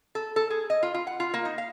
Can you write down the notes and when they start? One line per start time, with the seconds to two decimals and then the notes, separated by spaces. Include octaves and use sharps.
0.15 A4
0.36 A4
0.50 G#4
0.70 D#5
0.83 F4
0.94 F4
1.07 F#5
1.20 F4
1.34 A#3
1.45 D#4
1.58 F5